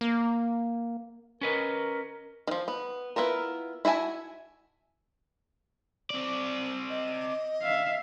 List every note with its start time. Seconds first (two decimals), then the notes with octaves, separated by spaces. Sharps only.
0.01 A#3
1.41 C#4 A#4 B4 D#5
2.47 D#3 F3
2.68 B3
3.16 B3 E4 F4 A#4
3.85 E4 F#4 E5 G#5 A5
6.10 C4 D5
6.89 D#5
7.62 E5 F5